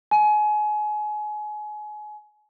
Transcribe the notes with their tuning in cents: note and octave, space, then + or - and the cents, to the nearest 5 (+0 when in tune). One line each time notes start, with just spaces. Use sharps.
G#5 +30